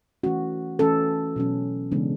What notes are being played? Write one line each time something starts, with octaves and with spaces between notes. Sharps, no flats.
E3 A3 C#4 F#4
E3 A3 C#4 A4
B2 F#3 C#4
C#3 E3 G#3 B3 D4